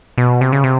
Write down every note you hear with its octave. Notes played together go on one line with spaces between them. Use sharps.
B2
C3
C#3
C3